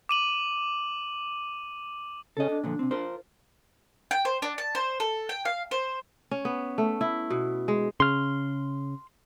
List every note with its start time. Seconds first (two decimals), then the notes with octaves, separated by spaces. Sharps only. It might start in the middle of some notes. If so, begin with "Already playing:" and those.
0.09 D6 D#7 F#7
2.37 C#3 A4 D#5
2.50 D4
2.64 A#2 D3 F3
2.79 C3 C4
2.91 F4 A#4 C5
4.11 G5
4.25 C5
4.42 D4
4.58 A5
4.75 C5
5.00 A4
5.29 G5
5.45 F5
5.71 C5
6.31 C#4
6.45 B3
6.78 A3
7.01 E4
7.30 B2
7.68 G#3
8.00 C#3 C6 F6